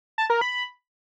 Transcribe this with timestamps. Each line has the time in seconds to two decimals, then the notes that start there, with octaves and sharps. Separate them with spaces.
0.18 A5
0.30 A#4
0.41 B5